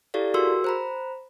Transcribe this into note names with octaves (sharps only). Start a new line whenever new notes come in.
E4 G4 A4 D5 F5
F#4 G#4 A#4 C6 E6
C5 A#5 B5